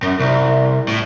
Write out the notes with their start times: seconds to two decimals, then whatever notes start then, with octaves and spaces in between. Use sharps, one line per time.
0.03 F#2
0.19 C2
0.88 A2